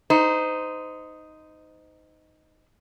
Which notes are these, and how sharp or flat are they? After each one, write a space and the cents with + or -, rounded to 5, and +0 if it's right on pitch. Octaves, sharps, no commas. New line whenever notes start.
D#4 +0 C5 -30